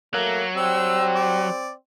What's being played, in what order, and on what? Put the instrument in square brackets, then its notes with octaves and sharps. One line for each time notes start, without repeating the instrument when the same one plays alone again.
[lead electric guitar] F#3 [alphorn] A3 [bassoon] A#3
[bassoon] G3 [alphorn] C4 [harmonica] E6
[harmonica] D5